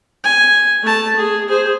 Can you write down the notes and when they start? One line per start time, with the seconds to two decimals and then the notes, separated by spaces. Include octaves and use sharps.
0.24 G#5
0.83 A3 A5
1.16 G#4
1.49 G#4 C5